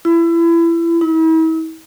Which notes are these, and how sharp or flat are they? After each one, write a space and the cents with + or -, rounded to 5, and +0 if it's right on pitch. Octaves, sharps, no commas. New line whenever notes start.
E4 +25
E4 -40